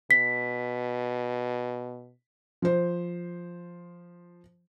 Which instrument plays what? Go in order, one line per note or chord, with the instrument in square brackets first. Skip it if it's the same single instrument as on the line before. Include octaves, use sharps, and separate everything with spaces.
[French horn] B2 [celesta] B6
[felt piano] F3 C5